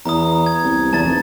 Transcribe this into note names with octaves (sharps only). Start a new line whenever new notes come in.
E2 A#5 D#6
G#6
C2
E2 A5 A6
F1